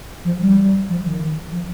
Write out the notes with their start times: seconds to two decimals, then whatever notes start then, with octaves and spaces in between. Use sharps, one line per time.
0.25 F3
0.41 G3
0.89 F3
1.04 D#3
1.52 F3